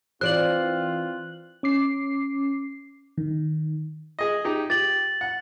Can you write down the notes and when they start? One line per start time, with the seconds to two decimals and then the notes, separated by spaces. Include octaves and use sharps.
0.21 E3 C4 F4 C5 D5 F#6 F#7
1.63 C#4 D6 C7
3.18 D#3
4.19 G#4 D#5
4.45 D#4 G4 G#4
4.70 G4 A6 F#7
5.21 F#5